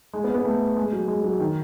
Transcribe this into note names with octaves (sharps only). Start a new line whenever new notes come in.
G#3
B3
B3
A3
G#3
F#3
G#3
F#3
D#3